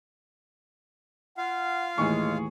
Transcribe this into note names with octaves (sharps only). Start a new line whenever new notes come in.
F4 F5 F#5
D#2 A2 E3 G#3 G#4 C#6